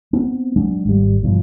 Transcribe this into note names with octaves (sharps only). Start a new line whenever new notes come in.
B3 C4
F#3 G#3 D4
G#1 G3
G2 B2 F3